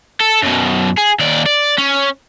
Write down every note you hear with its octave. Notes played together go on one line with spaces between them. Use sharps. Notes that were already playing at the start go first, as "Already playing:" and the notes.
A4
F#2 B2
G#4
D#2 D5
D5
C#4